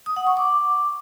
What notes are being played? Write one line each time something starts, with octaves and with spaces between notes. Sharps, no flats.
D#6
F#5
C#6
D6